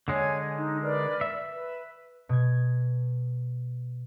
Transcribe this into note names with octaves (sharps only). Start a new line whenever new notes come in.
D3 G#3 C#5 G#5
D#4
A#4 B4 D5
E5
B4
B2 G#6